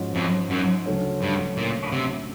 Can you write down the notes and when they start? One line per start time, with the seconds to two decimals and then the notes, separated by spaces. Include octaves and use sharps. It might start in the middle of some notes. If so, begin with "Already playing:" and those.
Already playing: G#2 F3 G#3 C#4 F#4
0.15 F2
0.50 F#2
0.86 D2 C#3 F#3 A3 C#4
1.22 G2
1.57 A#2
1.92 C3